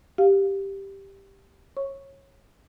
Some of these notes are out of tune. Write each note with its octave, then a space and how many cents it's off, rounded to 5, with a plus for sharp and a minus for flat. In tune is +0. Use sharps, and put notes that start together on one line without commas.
G4 +0 F5 +10
C#5 -20 C#6 +0